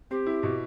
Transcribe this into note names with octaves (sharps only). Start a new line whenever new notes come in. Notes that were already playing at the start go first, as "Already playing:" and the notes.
C4 G4
E4
B2